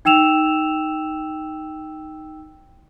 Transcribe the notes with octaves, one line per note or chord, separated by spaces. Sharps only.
D#4 G5 E6 E7 F7